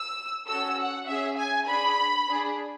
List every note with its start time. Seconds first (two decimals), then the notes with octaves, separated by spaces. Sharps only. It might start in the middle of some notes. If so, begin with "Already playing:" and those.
Already playing: E6
0.47 C#4 F#4 A4 E6
0.77 F#5
1.07 C#4 G#4 E5
1.37 G#5
1.67 D4 G#4 B5
2.28 D4 G#4